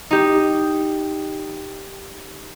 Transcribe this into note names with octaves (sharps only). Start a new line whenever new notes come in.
D#4 G4